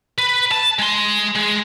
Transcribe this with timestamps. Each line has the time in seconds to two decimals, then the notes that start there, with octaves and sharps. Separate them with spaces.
0.18 B4
0.52 A5
0.79 G#3 C6
1.36 G#3